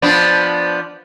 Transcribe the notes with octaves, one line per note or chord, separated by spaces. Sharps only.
F3 B3 D4